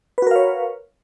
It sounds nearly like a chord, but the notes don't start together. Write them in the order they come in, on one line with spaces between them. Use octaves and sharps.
B4 F#4 A#4 F5 C#5